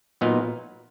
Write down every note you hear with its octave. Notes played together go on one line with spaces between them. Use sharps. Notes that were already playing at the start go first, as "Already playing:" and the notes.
A#2 F#3 B3 D#4 F5